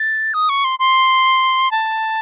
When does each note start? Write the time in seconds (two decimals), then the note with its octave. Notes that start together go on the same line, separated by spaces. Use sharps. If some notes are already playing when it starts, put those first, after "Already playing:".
Already playing: A6
0.34 D#6
0.49 C#6
0.64 C6
0.79 C6
1.71 A5